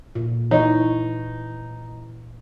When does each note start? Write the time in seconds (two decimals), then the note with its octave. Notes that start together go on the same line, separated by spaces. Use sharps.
0.15 A#2
0.51 E3 D#4 C#5